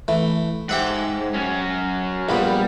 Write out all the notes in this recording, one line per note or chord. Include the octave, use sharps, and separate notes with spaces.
E3 A3
G#2 G4 E5 F#5
F#3 C#4
A#1 G3 A#3 B3